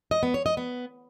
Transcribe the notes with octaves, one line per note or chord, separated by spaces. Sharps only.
D#5
B3
C#5
D#5
B3